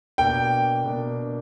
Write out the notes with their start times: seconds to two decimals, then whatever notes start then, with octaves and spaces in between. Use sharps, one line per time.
0.18 B2 A#3 D4 G5
0.84 B2 A#3 D4